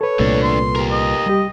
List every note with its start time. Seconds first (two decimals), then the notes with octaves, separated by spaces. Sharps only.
0.01 A4 B4 C#5
0.20 C2 A#2 A3 D4
0.42 C6
0.76 G4 A#4
0.91 D#5
1.26 G3 G4